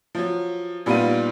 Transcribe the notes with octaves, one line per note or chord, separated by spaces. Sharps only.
F3 F#3
A#2 G3 B3 D#4 F4 D#7